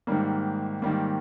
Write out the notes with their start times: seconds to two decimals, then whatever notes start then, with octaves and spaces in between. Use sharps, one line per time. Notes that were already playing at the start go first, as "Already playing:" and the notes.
0.07 G#2 D#3 G3 A#3
0.82 G#2 D#3 G3 A#3